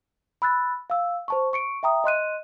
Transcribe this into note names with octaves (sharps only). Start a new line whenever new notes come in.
B5 E6 F#6 A6
F5 E6
C5 A5 C#6
C#6 C#7 D7
E5 G5 A#5 D#6
D#5 C6 F#6 D#7